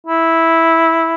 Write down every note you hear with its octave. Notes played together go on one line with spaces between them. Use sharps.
E4